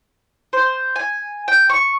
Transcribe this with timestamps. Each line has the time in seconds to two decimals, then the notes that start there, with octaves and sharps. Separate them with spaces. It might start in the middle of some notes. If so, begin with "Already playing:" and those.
0.53 C5
0.96 G#5
1.48 G5
1.70 C#6